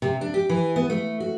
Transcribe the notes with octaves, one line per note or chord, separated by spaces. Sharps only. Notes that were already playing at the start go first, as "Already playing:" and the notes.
C3
D4
G4
E3
B3
A3
F#4